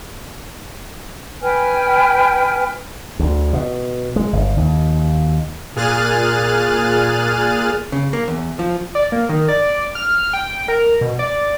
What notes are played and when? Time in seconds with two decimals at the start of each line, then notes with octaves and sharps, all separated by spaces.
1.42 B4 G5 G#5 F6
3.19 D2
3.53 B2
4.16 G#3
4.33 G1
4.57 D#2
5.76 A#2 G#4 F6 F#6 A6 D#7
7.92 C#3
8.13 A#3
8.28 E2
8.59 F3
8.95 D5
9.12 A#3
9.29 D#3
9.48 D5
9.95 F6
10.33 G5
10.68 A#4
11.01 B2
11.19 D5